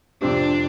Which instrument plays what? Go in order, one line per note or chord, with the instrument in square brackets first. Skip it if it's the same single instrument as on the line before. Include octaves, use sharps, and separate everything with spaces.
[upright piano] F2 C3 G3 C4 G4 [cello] D4